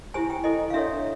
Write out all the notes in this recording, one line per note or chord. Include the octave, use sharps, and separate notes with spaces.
E4 G4 C5 G#5
G5
E4 A4 C5 D#5
F5
D4 F#4 A4 C#5 E5